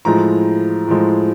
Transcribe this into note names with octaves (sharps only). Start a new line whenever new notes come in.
A2 F3 G#3 A#5
A2 F3 G#3